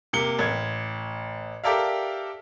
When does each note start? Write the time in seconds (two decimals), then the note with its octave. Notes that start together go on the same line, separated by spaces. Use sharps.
0.13 C3 A#3 C#7 G7
0.39 A1 G#6
1.64 G4 A4 A#4 D5 E5 F5